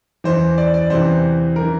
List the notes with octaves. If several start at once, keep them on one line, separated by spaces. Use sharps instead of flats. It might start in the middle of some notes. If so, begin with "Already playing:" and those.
E2 E3 C5
D5
D5
E2 C3 E3 C5
E3 A#4